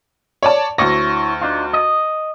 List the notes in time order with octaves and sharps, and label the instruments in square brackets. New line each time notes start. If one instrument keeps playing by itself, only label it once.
[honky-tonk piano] C#5 D5 A5
[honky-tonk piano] D2 A#6 [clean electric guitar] E4 C#5
[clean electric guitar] D4 D#4 F4
D#5